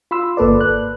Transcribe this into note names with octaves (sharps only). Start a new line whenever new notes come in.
F4 B5 C6 E6
G1 A#3 A4 B4 D5
F#6